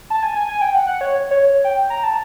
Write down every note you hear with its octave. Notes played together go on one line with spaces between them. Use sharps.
A5
G#5
G#5
G#5
G5
F#5
F#5
C#5
C#5
G5
A#5
A5